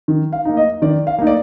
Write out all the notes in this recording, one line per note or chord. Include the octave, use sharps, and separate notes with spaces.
D#3
F5
A#3 D#4
D#5
D#3 D5
F5
A#3 D#4
D5